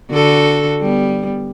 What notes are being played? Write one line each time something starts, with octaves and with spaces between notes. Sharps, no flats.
D3 F#4 A4
G3 B3